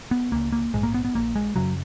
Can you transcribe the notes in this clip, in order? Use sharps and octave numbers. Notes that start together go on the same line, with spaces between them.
B3
C#2 C#3 A#3
A#3
A#1 G#2 G#3
A#3
B3
B3
A#1 A#2 A#3
G#3
F#2 C#3 F#3